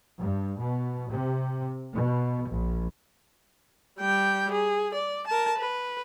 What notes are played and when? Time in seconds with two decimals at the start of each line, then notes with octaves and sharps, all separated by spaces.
0.19 G2
0.61 B2
1.10 C3
1.94 B2
2.50 A#1
4.00 G3 G5
4.52 G#4
4.94 D5
5.27 A#4 A5
5.58 B4